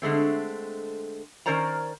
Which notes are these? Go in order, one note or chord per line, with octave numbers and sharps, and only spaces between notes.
D3 G#3 A3 C4
D#3 C#4 A#4 C5 D5 A#5